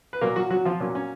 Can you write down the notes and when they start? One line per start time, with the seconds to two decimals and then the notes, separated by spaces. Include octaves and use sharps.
0.13 B4
0.21 A#2 F#3 A#3 A#4
0.36 F#3 F#4
0.51 F#3 F#4
0.65 F3 F4
0.80 A#2 F#3 A#3 C#4
0.95 C#4